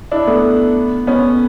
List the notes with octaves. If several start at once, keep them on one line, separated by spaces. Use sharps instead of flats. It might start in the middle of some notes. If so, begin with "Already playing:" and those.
D4 E4
A3 B3
B3 C#4